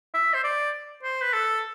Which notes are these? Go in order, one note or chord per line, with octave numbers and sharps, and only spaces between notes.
E5
C5
D5
C5
B4
A4